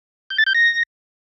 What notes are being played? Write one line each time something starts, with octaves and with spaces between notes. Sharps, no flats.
G6
A6
G6
A#6